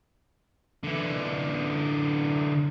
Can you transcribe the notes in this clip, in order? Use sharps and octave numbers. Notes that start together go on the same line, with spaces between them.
D3 E3